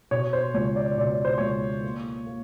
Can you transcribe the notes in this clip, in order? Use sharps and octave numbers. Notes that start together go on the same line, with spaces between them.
B2 C#5
C5
C#2 C#5
D5
B2 D5
C#5
C5
C#2 C#5
A#3
A#3